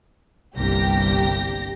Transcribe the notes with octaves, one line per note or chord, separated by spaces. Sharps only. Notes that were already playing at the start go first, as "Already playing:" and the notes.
G1 C2 G2 A#3 G4 A#6